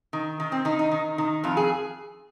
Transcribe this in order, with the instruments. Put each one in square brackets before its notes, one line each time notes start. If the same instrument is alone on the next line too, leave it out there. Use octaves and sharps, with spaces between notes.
[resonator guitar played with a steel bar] D#3
D#3
C4
D#3 D#4
D#4
D#3
D#3
F2 F4
G#4